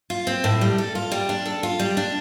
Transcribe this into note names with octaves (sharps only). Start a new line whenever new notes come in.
F4
C4
A2
G3
A4
F4
G3
D4
A4
F4
G3
D4